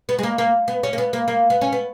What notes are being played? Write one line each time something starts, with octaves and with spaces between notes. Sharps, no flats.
B3
G#3
A#3
A#3
B3
C#4
A#3
B3
A#3
A#3
B3
C#4
B3